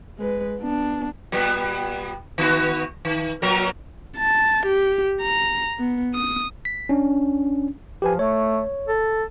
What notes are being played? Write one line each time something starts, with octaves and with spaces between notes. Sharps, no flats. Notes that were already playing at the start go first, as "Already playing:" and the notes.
G#3 B4
B3 D4
A#2 G3 B3
D#3 B3 F#4
D#3
A#2 F#3 A#4
A5
G4
A#5
B3
D#6
B6
C#4 D4
F3 G4 B4 G#5
A3 C#5
A4